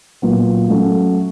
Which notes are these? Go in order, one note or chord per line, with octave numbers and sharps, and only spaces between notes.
A#2 F#3 B3
F#3 A3 C#4 F#4